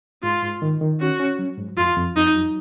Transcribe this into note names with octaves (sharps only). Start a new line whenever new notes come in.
G#2 F4
G#2
D#3
D#3
C#4 F#4
C#4
F#3
G#2
F2 F4
F2
F2 D#4
F#3